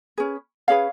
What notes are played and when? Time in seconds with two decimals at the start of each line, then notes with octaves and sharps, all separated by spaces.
0.18 C#4 G#4 B4
0.68 C#4 G#4 B4 C#5 F5